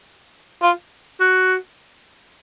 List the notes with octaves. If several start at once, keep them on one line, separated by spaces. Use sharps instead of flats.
F4
F#4